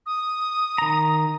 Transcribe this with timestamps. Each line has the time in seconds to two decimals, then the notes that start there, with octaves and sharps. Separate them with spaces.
0.06 D#6
0.78 D#3 A#5